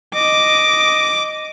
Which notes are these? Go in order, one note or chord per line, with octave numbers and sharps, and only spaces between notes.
D#5 D6